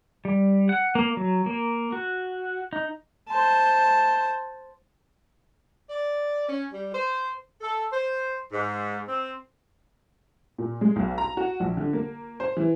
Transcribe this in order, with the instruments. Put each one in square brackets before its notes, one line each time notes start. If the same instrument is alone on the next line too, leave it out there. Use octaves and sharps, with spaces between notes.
[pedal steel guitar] G3
F#5
A#3
F#3
A#3
F#4
D#4
[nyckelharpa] C5 A5
[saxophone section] D5
C#4
G3
C5
[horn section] A4
C5
G#2
C4
[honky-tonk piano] A#2
G#3
B1
A#5
F#4
A#1
D3
A#3
C5
E3